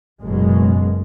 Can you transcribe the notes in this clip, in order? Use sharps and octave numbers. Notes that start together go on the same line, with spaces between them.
F#1 F#2 B2 G#3